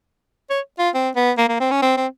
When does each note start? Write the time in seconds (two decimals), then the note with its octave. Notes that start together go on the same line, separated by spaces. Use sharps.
0.50 C#5
0.79 F4
0.94 C4
1.16 B3
1.38 A#3
1.49 A#3
1.60 C4
1.71 C#4
1.82 C4
1.97 C4